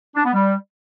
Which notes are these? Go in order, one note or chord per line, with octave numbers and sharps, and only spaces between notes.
D4
B3
G3